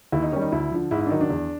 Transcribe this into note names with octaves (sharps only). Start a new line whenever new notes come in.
D#2 E4
D#4
D#3 G3 C#4
D#4
D2 E4
D3 F3
G#2 E4
E4
D4
D#3 F#3 D#4
D4
E2